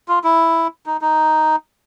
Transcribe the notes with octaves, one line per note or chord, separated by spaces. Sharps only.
F4
E4
D#4
D#4